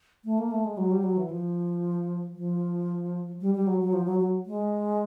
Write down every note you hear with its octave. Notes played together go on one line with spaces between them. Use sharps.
A3
A#3
A3
G#3
F#3
G3
F#3
E3
F3
F3
G3
G3
F#3
F#3
F3
F#3
F#3
G#3